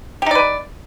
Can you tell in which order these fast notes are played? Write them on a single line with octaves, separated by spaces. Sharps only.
G4 D#4 D5 B4